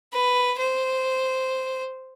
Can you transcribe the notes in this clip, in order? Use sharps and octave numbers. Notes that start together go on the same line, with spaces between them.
B4
C5